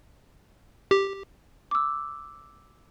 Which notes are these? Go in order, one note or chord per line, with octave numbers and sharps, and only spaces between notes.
G4
D6 E6